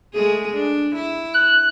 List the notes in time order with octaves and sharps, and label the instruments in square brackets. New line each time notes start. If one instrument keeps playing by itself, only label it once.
[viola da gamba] G#3 A3 G#4
D4
E4
[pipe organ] F#6